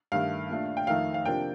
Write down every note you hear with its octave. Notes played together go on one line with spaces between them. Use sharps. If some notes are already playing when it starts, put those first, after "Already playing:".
G2 D#3 A3 F5
A#2 A3 D4
G5
F2 D#3 A3 D#4 F5
F5
C3 F3 A#3 D4 G5